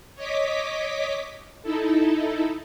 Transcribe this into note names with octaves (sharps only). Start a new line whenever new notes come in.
C#5 D#5 D6 B6
D#4 E4 A4